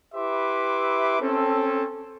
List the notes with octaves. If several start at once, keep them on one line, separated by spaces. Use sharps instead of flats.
E4 G4 B4 E5 C6 D6
C4 C#4 A4